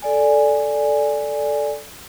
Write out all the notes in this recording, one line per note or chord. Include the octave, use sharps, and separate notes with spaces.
A4 D5 G#5